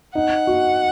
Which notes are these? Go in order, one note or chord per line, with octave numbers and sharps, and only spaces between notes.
D#4 F#5
F#4